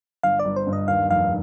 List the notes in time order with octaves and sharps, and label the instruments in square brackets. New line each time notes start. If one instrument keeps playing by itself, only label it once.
[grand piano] G1 [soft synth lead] F5
[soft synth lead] D5
[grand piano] G1
[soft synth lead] C5
[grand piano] G2
[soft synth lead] D#5
[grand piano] D#2 [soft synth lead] F5
[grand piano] F1 [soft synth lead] F5